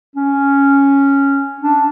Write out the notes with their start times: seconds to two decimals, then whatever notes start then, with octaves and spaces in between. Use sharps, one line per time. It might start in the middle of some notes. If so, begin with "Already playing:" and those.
0.16 C#4
1.61 D4